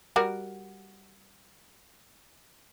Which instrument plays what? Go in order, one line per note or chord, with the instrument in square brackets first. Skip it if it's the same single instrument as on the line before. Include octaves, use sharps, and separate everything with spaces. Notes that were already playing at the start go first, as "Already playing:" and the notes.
[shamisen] G3 F#4 A#4